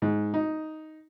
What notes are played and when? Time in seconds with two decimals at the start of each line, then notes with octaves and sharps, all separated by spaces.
0.02 G#2
0.34 D#4